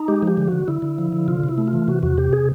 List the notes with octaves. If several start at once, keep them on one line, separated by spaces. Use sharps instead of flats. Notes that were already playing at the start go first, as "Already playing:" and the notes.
Already playing: D#4
G#3 G4
F3 G4
D3
D3 F#4
D3 E4
D3
F3
D3
C3 F4
C3
E4
A3
F4
E3
C3 F#4
E2 F#4
C3 G4
G#4